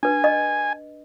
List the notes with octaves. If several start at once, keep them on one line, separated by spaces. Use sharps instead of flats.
D4 B4 G#5
D#5